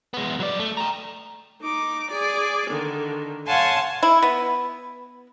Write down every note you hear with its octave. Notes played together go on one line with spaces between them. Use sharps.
G#3 B3
F#3 D5
A3
G5 A#5
D#4 D6
G#4 D5
D3 D#3
C#5 F5 F#5 G#5 A5 C6
E4
B3